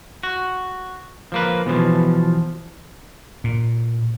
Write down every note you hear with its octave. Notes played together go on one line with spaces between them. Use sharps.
F#4
F3 A#3 B4
B2 E3 F3
A#2